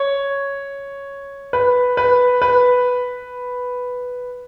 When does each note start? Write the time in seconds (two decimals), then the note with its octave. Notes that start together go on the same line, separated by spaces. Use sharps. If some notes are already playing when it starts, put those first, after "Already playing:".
Already playing: C#5
1.53 B4
1.97 B4
2.42 B4